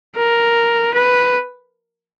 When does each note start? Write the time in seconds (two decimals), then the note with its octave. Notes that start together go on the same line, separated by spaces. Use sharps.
0.16 A#4
0.94 B4